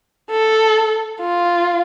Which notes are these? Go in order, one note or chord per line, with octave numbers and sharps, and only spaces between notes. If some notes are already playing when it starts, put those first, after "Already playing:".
A4
F4